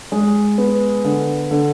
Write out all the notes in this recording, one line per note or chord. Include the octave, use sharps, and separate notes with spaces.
G#3
B3
D3
D3